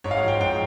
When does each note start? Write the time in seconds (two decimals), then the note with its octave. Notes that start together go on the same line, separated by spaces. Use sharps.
0.04 G#2 C#5
0.11 F5
0.17 F#5
0.23 F3 G5
0.41 G#2 G5